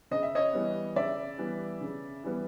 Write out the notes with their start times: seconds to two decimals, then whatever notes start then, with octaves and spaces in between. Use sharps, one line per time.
0.11 C#3 D#5
0.23 E5
0.35 C#5 D#5
0.53 E3 G3 B3
0.96 C#3 D5 E5
1.38 E3 G3 B3
1.81 C#3
2.24 E3 G3 B3